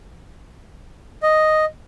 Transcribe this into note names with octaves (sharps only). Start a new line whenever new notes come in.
D#5